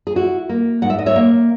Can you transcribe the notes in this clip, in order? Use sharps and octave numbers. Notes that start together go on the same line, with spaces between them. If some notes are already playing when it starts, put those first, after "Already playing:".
G#4
E4 F#4
A#3
G#2 F#5
E5
D#5
C#5 E5
A#3